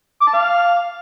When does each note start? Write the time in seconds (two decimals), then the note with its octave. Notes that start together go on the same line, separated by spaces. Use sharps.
0.21 D6
0.28 A5
0.34 F5